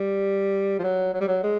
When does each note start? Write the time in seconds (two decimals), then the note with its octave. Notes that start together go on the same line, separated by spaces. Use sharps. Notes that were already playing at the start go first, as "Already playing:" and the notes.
Already playing: G3
0.79 F3
0.83 F#3
1.14 F#3
1.21 G3
1.28 F#3
1.44 G#3